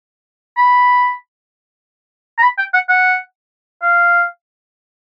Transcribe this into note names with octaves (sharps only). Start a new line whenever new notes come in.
B5
A#5
B5
G5
F#5
F#5
F5